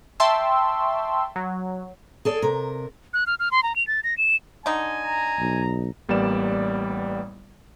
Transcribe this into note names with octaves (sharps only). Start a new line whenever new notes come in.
E5 G5 A5 C6 C#6 E6
F#3
G#4 A4 D5
C3 A#4
F#6
F6
F6
C6
A#5
F7
A6
A#6
E7
D3 D#4 G#5
A#5
B1
A1 G3 A#3 B3 D5 E7